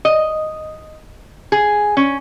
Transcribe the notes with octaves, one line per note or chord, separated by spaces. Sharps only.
D#5
G#4
C#4